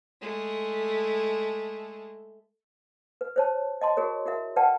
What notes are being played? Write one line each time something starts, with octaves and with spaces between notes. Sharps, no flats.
G#3 A3
B4
C5 C#5 A5
D#5 A5 C6
F#4 G#4 A#4 C#5
E4 F#4 A#4 E5
B4 D5 F#5 G5 A5